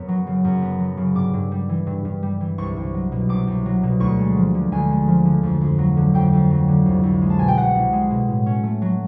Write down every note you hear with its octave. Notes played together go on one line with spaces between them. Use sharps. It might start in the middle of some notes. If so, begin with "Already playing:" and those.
Already playing: F#2 B3
F#3
C#3
F#2
B3
F#3
C#3
G2 D6
G2
G3
E3
G2
G2
G3
E3
C2 C#6
C2
F#3
B2
C2 D6
C2
F#3
B2
D2 C#6
G#3
F3
D3
D2 G#5
G#3
F3
D3
F2
F2
F#3
D3
F2 G5
F2
F#3
D3
C2
C2
G#3
A5
B2 G#5
G5
C2 F#5
C2
G#3
B2
A2
C#4
A3
F#3